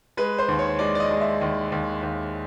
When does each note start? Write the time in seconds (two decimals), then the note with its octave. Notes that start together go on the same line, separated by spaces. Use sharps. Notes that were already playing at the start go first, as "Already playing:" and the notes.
0.17 G#3 B4
0.39 C5
0.48 D#2
0.59 C#5
0.79 G#3 D5
0.95 D5
1.00 D#5
1.11 G#3
1.21 E5
1.41 D#2
1.72 D#2
2.03 D#2